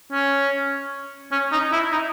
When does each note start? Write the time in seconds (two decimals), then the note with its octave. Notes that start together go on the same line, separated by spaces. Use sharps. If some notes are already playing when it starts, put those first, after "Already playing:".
0.12 C#4
1.32 C#4
1.52 D#4
1.72 E4
1.92 D#4